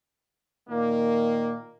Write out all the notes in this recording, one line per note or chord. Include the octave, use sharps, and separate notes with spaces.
A#2 D#3 A#3